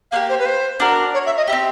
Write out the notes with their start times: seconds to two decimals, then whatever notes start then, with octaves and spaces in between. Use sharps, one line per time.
0.12 A#3 D4 G4 F5
0.29 C5
0.39 B4
0.46 C5
0.80 D4 F#4 A#4
1.14 C#5
1.26 E5
1.37 D#5
1.47 E4 G4 E5
1.52 C4